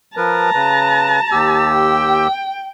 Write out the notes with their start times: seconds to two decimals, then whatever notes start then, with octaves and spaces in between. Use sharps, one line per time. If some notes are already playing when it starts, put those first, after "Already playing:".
0.17 F3 A#4 B4 A5 A#5
0.54 C#3 B4
1.32 D#2 G4 E6
1.76 G5